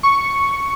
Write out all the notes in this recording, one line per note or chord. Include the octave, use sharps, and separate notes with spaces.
C#6